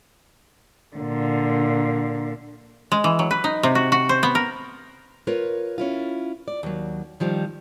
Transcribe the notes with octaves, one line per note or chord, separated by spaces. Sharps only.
A#2 D3
G#3
E3
F#3
B4
D#4
C3
F#4
F#4
C5
B3
A#4
F4 A#4 B4 C#5
C#4 E4 F4
D5
D#2 F#3
D#3 F3 G3